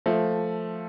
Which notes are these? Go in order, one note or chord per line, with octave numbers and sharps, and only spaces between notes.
F3 A3